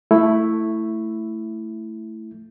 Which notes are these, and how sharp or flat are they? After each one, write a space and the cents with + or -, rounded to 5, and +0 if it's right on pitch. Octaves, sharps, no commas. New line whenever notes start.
A3 +10 E4 +0